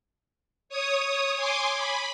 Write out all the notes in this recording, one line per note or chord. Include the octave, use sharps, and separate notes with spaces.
C#5 D#6
G#5 C6 D6
B5